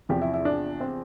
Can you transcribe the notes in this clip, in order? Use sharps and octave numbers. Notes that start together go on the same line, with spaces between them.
E2 C3 F3 G4
E4
E4
D4
C4